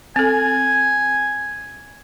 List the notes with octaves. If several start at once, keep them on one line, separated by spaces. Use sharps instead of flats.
C4 A4 G#5